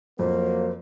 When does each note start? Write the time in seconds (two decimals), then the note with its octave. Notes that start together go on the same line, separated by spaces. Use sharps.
0.19 F2 F#3 A#3 C5